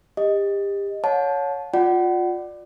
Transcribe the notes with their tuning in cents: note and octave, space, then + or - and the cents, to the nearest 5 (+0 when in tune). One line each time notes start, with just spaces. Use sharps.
G4 +30 D#5 +0
C#5 +10 F#5 -40 A5 -20
F4 +20 D5 +15 F#5 +30